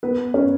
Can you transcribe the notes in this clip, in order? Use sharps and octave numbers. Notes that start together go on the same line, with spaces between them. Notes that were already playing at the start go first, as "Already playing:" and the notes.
B3 B4
C#4 C#5